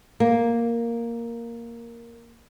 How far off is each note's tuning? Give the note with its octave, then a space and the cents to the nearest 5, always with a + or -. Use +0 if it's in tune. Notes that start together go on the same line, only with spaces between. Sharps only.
A#3 +0